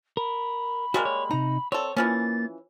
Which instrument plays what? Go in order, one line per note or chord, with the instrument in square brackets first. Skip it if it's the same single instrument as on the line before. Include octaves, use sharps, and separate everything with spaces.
[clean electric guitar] A#4 [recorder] B5
[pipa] G3 G#3 A#3 [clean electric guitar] F#4 A#4
[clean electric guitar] C#5
[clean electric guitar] C3 D#4 [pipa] A#5
[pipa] C4 A4 [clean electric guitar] C#5 [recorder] D5
[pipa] E3 F3 C#4 [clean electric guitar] A#3 [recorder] A6